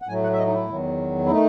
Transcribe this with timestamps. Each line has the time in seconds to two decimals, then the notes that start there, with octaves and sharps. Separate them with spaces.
0.02 F#5
0.07 A2 F#3 A3 G#5
0.23 F#5
0.33 E5
0.38 D#5
0.47 D#4
0.54 E4
0.70 E2 D#3 F#3
1.26 E4
1.30 D#3 A3 D#4